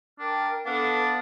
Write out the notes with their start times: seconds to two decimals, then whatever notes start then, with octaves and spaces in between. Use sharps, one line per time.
0.19 D4 A#4 G5 F6
0.66 B3 D4 A4 B4 F5 F#5